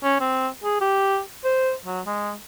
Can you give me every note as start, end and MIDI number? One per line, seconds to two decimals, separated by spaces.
0.04 0.16 61
0.20 0.48 60
0.64 0.81 68
0.81 1.20 67
1.44 1.73 72
1.86 2.01 54
2.06 2.33 56